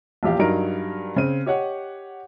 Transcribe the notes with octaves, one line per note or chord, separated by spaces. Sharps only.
A#1 E2 G4 F5
G2 F#3 D#4 A#4 D7
C#3 C4 D#7
G4 C#5 D#5 F#5